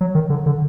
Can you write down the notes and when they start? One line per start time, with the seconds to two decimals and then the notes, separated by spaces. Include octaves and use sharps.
0.01 F#3
0.15 D#3
0.30 D3
0.46 D3